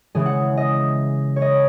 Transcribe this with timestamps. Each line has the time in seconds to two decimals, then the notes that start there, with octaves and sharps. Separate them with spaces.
0.15 C#3 E3 G#3 G#4
0.26 F#5
0.57 D#5
1.36 C#5
1.42 D#5